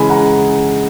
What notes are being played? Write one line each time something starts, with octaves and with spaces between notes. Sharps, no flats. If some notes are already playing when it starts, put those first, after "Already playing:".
Already playing: C#3 E3 G#3 G#5 B5
F#5 A#5